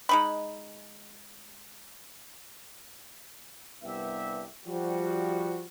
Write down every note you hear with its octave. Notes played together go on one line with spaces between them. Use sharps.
G#3 D#4 B5
C2 G2 B3 G4 E5
F3 G3 F#4